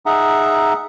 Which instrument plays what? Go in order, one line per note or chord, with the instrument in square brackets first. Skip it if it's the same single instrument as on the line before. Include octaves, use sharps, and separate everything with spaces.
[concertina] D#4 G#4 E5 F#5 A#5